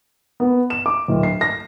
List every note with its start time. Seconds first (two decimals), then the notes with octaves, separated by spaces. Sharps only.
0.40 B3
0.70 E7
0.86 D6
1.08 D1
1.23 C7
1.41 A#6